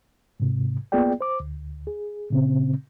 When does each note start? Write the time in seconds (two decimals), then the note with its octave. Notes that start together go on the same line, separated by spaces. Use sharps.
0.40 G#2 C3
0.92 A#3 B3 F4 G#4 D5 G5
1.21 C5 D6
1.40 D2
1.87 G#4
2.30 A#2 C#3 C4